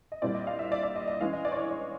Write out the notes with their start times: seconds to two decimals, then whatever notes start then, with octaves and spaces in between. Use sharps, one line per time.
0.12 D#5
0.22 A#2 G3 C4 E4 D5
0.34 D#5
0.47 F5
0.59 E5
0.72 D5
0.83 D5
0.96 D#5
1.08 D#5
1.21 E3 G#3 C#4 F5
1.33 D#5
1.45 D5
1.52 C#5
1.57 D5
1.70 D5